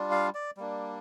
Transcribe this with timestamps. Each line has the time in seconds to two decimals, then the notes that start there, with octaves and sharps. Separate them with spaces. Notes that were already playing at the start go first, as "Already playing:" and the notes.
Already playing: G3 D4 F4
0.11 F5
0.34 D5
0.57 G3 A#3 D4